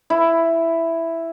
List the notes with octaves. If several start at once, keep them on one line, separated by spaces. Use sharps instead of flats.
E4